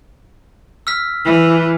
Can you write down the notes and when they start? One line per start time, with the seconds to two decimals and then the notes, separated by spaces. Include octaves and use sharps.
0.87 E6 F6 B6
1.24 E3